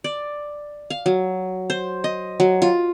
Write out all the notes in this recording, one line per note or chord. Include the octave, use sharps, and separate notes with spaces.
D5
F5
F#3
C5
D#5
F#3
F4